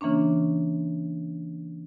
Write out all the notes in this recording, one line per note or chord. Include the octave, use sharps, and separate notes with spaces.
C#3 E3 A#3 C#4 D4